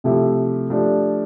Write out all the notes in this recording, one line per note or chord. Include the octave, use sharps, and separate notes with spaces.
C3 F3 A3 E4 G4
F3 A3 D4 G4